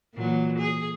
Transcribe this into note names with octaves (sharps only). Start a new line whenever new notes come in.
A#2 E3 F#3
G#4